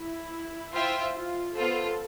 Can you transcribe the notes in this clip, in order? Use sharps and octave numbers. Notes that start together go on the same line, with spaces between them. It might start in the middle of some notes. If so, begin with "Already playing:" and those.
Already playing: E4
F4 C5 E5 G5
F4
B3 F4 A4 C5